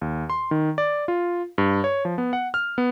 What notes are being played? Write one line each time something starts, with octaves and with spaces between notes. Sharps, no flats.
D#2
C6
D#3
D5
F4
G2
C#5
F3
B3
F#5
F6
B3